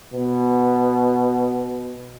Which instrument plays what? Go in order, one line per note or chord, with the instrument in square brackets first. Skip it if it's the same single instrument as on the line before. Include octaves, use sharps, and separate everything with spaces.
[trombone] B2